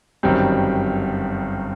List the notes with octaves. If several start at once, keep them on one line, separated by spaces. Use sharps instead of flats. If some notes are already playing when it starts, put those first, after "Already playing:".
G1 F#2 D#3 G3 C4